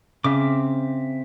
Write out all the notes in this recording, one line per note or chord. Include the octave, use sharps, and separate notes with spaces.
C#3 C4 E5 D6